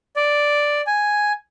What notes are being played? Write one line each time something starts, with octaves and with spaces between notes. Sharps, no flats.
D5
G#5